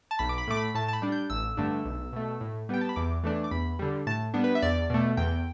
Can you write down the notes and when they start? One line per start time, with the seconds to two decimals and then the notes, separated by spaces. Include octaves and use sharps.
0.11 A5
0.19 B1 B5
0.29 D6
0.38 B5
0.47 A2 A3 D6
0.57 B5
0.75 A2 A5
0.88 A5
0.93 B5
1.02 G3 D4
1.12 G6
1.30 A1 E6
1.57 G2 D3 A3 D4
1.85 B1
2.13 B2 A3
2.41 A2
2.69 G3 B3 G5
2.81 A5
2.89 B5
2.96 E2 D6
3.24 E3 A3 D4
3.44 D6
3.51 E2 B5
3.79 D3 G3
4.07 A2 A5
4.34 G3 B3 D4
4.44 B4
4.55 E5
4.62 E2 D5
4.90 B2 A3
5.17 E2 G5